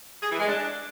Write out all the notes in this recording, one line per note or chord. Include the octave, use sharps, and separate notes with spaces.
G#4
E3
G#3
D4